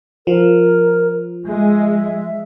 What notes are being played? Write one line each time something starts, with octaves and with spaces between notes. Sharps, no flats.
F3 A#4
G#3 E5